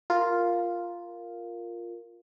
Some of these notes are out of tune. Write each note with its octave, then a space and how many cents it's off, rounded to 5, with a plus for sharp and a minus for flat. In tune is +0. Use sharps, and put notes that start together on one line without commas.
F4 +0 A#4 -5